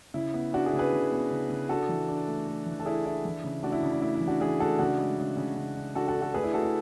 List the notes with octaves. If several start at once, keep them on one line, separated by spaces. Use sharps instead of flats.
C#3 E4
B3
B3 D4 F#4
E4 G#4
C#3
G#4 B4
C#3
B3
C#3
C#3
D4 F#4 A4
E3
D4
A3
A3
E3
A4
D4 E4 G#4
D4 E4
E3
C#3
A3 D4 F#4
E4
C#3 D4
D4
A3 E4
E4
E3
D4 F#4
E3 E4 G#4
A3 F#4 A4
C#3 D4 F#4
G#3
C#3
C#3
C#3
D4
D4 F#4 A4
F#4 A4
D4
F#4 A4
A3 G#4 B4
E4
A3 F#4 A4
E4 G#4